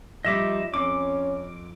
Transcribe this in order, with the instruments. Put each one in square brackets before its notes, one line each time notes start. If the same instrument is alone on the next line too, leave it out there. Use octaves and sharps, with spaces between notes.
[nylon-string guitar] F3 G3 D#4 [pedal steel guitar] D#5 E5 D6
[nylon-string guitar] F2 [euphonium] C#4 [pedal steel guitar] D6